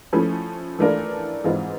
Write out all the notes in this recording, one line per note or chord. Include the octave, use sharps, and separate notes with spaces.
F3 A3 C#4 E4
E3 A3 D4 F4 A#4
G#2 E3 G#3 C4 F4